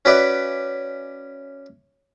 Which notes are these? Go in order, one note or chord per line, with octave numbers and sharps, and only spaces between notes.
C#4 F#4 B4 D5 E5